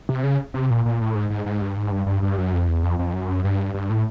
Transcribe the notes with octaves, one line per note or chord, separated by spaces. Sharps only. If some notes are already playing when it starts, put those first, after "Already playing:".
C3
C#3
C3
A#2
A#2
A2
G#2
G#2
G#2
G2
G#2
G2
G2
G2
F#2
F2
E2
F2
F2
F#2
G2
G2
A2